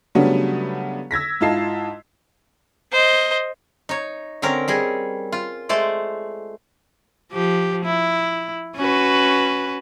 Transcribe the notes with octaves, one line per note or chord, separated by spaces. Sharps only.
C#3 F#3 G3 A3 B3 D4
E6 G#6 A#6 B6
G#2 E4 F4 D#5 A5 C7
C5 D#5
D#4 C#5
D3 C4 C#4 A#4
G3 G#4 D#5
F4
G#3 A3 C5 D5
F3 G4
E4
C#4 F#4 B4